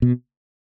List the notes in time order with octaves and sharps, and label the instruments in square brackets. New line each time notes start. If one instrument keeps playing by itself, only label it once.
[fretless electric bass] B2